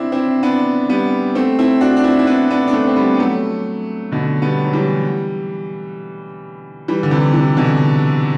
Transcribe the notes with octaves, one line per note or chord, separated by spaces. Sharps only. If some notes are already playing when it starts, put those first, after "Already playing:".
Already playing: C4 D4 E4
C4 E4
B3 D4
G3 B3
A3 C4
C4 E4
D4 F#4
D4
C4 E4
E4
B3 D4
B3 D4
D4
A3 C4
C4
G3 B3
B3
F#3 A3
B2 D3
G3 B3
F#3
E3 G3
E3 G3
D3
C3 E3
C3 E3
E3
B2 D3